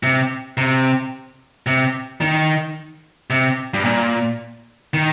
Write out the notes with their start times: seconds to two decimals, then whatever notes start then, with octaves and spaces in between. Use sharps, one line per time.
0.03 C3
0.57 C3
1.67 C3
2.21 D#3
3.30 C3
3.74 G2
3.85 A#2
4.94 D#3